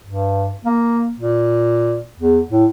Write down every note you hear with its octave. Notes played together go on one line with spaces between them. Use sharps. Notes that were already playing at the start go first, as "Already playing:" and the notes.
G2
A#3
A#2
E2
A2